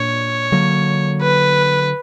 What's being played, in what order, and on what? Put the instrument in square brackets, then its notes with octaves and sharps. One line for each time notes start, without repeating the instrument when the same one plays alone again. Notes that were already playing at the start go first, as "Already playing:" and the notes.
Already playing: [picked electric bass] A#2 A#3 D4 [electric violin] C#5
[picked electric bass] D3 F#3 A#3
[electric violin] B4